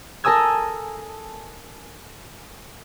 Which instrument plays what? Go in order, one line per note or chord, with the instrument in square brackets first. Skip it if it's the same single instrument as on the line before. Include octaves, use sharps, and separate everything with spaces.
[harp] A4 A#4 G#5 D#6 E6 G#6